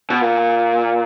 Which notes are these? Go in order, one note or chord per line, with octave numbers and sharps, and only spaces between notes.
B2
A#2